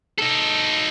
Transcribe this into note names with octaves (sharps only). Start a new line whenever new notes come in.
D#4 A4